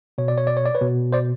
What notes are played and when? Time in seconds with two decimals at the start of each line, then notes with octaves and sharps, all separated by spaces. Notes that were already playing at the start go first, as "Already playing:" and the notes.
0.18 B2 C#5
0.28 D5
0.38 C#5
0.47 D5
0.57 C#5
0.66 D5
0.75 B4 C#5
0.81 B2
1.12 C5 D5